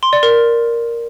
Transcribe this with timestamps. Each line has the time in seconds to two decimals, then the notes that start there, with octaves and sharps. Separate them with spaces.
0.03 C6
0.13 D5
0.23 A#4